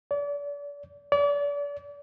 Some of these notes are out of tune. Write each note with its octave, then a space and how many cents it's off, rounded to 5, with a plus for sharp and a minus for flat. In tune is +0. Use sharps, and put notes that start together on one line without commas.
D5 -35
D5 -35